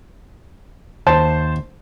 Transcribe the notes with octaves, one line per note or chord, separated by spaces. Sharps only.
D#2 C5 A5